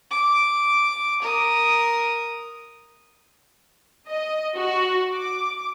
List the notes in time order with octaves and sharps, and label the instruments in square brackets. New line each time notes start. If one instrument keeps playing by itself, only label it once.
[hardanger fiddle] D6
A#4 D#6
[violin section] D#5
F#4
D6